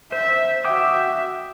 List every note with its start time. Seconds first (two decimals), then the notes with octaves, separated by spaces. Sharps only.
0.12 C5 E5
0.65 F#4 E5 G5 D6 D#6